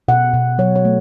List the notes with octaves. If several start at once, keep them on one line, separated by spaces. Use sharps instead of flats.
B2 F#5
B2
F#3 C#5
C#5
A3